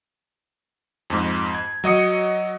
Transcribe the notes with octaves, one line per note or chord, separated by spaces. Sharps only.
F2 G#2
G#6
F#3 D#5 D#6 C#7